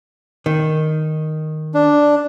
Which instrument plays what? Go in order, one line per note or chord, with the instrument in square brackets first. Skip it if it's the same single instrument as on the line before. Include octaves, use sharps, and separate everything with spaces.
[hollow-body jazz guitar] D#3
[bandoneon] D4